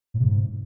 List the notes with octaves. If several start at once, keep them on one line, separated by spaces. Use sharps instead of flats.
A2
C3
G#2